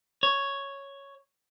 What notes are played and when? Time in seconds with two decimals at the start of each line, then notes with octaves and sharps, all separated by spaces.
0.23 C#5